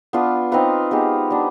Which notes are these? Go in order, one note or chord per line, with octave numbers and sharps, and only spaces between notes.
B3 D4 F4 B4
C4 D#4 B4 F5
G#3 B3 D#4 G4
G3 B3 D4